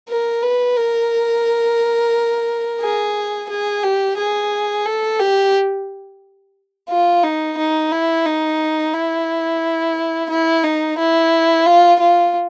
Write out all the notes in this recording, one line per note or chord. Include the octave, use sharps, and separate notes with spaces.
A#4
B4
A#4
G#4
G#4
G4
G#4
A4
G4
F4
D#4
D#4
E4
D#4
E4
E4
D#4
E4
F4
F4